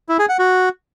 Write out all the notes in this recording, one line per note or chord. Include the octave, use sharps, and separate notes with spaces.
E4
G#4
F#5
F#4